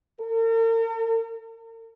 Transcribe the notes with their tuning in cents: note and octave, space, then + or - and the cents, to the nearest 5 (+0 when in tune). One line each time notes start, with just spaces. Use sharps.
A#4 -45